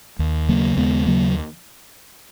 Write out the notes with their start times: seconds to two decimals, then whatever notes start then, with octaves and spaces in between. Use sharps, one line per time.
0.19 D#2
0.49 C#3 F#3 A#3
0.77 D#2 G#3 B3
1.07 C#3 F#3 A#3